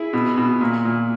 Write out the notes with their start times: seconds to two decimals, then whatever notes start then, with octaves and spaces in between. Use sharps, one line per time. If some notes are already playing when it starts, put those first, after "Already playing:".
Already playing: E4 G#4
0.13 B2
0.38 B2
0.61 A#2
0.85 A#2